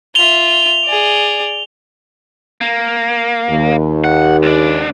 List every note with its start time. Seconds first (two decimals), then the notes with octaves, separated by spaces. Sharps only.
0.15 F4 E5 F7 G7
0.85 G#4 D5
2.61 A#3
3.50 D#2
4.04 F#5
4.43 C#2 D4